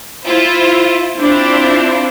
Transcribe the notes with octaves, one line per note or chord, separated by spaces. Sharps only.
E4 F4 C5
C4 D4 E4 F4